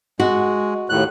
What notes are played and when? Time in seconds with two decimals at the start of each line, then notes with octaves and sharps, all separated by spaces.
0.20 G#3 F#4
0.89 D#2 A2 F#6